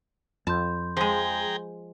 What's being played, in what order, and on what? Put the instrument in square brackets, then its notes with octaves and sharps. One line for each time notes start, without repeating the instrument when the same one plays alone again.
[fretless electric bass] F2 [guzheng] A5 [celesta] B5 C6 G6
[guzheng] F3 G#3 [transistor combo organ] G#4 G5 A#5